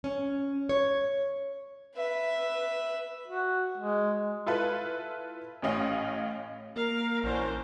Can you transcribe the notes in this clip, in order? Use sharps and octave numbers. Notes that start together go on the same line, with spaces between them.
C#4
C#5
B4 E5
F#4
G#3
E4 F4 A4 B4
A1 A2 C#4 D#5 F5 G5
A#3 A#4 F5
A#1 E3 C#4 D4 F#4 C5